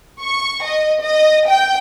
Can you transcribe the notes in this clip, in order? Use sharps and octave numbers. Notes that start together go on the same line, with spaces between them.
C#6
D#5
D#5
G5